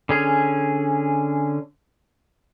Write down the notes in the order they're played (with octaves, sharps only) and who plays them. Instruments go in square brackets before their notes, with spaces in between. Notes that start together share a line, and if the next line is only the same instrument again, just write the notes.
[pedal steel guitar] D3 C#4 G#4